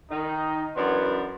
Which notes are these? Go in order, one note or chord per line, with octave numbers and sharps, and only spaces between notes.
D#3 D#4
F#2 E3 B3 D4 B4 C6